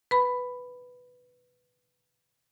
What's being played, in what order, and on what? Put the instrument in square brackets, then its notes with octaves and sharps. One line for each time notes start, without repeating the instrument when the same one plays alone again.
[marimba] B4 B5